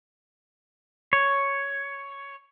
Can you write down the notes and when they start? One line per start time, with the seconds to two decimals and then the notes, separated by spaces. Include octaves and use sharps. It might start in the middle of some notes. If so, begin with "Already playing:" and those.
1.13 C#5